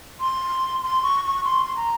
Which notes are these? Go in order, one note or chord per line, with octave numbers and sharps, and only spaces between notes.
C6
C6
C#6
C#6
C6
C6
A#5